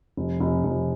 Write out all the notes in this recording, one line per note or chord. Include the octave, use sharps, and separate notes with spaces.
F1
F1
F1